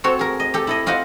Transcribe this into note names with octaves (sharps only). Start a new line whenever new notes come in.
C4 F#4 A4 C#5
G#4 A#4
D#5
G4 A4
E4 A4 D#5
C4 F4 C5 D#5 F#5